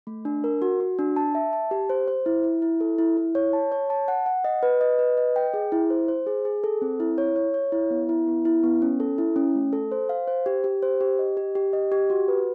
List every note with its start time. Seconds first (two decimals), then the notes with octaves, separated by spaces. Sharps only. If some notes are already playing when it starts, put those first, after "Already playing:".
0.07 A3
0.25 D4
0.44 A#4
0.62 F#4
0.80 F#4
0.99 D4
1.16 A5
1.35 E5
1.53 A5
1.71 G4
1.90 C5
2.08 C5
2.26 E4
2.44 E4
2.62 E4
2.81 A4
2.98 E4
3.17 E4
3.35 C#5
3.53 A5
3.72 C#5
3.90 A5
4.08 F#5
4.26 F#5
4.44 D#5
4.63 B4
4.81 D#5
4.99 B4
5.17 D#5
5.36 G5
5.54 G#4
5.72 E4
5.90 C5
6.08 C5
6.27 G#4
6.45 G#4
6.64 A4
6.82 C4
7.00 E4
7.18 C#5
7.36 C#5
7.54 C#5
7.72 E4
7.91 B3
8.09 E4
8.27 B3
8.45 E4
8.64 B3
8.82 C#4
9.00 A4
9.18 E4
9.36 C#4
9.55 A3
9.73 A4
9.92 C5
10.09 F5
10.28 C5
10.46 G4
10.64 G4
10.82 C5
11.01 G4
11.19 D#5
11.37 G4
11.55 G4
11.73 D#5
11.92 G4
12.10 F#4
12.28 B4